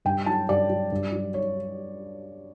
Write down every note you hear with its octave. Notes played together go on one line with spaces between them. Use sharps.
G2 G5
F#3 A5
G2 D5
F#3
G2
F#3
C#5